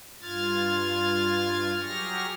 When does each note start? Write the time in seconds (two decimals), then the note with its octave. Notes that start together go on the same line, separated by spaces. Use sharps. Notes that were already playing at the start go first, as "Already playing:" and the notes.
0.22 G2 F4 F6 G#6 A6
1.81 F#3 G4 G#4 C#6 F6 A#6